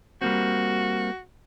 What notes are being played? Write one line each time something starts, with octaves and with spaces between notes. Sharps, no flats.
G3 A#3 C4 F#4